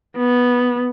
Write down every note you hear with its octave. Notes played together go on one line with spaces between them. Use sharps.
B3